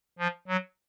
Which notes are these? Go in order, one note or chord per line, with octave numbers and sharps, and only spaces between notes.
F3
F#3